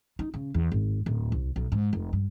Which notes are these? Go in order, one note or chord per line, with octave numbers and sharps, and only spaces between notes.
D#4
C#3
E2
G#1
D1
C2
B1
G#2
F1
G2